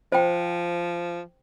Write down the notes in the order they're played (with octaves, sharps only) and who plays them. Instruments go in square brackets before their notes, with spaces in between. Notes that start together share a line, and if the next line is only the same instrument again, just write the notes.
[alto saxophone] F3 [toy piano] C5 G5